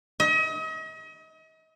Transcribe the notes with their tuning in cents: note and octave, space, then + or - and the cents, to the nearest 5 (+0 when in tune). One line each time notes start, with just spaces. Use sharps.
D#5 +40